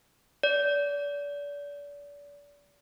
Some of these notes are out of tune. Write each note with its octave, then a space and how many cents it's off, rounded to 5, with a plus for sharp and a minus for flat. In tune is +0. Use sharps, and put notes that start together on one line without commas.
D5 -35